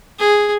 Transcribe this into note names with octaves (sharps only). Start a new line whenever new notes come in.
G#4